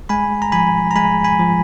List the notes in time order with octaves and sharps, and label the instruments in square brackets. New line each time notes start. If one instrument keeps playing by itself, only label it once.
[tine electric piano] G#3 G#5 B5
A#5
F3 G#5 B5
A#5
G#3 G#5 B5
G#5 B5
F3